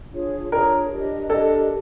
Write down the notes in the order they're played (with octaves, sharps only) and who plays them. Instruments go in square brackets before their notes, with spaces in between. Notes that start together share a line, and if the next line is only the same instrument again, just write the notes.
[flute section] D4 F4 G#4 C#5
[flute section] D4 F4 G#4 C#5 [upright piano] A#4
[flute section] D4 G4 A#4 D#5
[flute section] D4 G4 A#4 D#5 [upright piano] A4